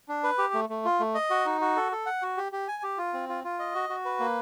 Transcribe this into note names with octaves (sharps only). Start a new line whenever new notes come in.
D4
B4
G4
A3
A3
F4
A3
D#5
F#4
D#4
F#4
A4
A4
F#5
F#4
G4
G4
G#5
G4
F4
C4
F4
F4
D#5
F#4
F#4
B4
A#3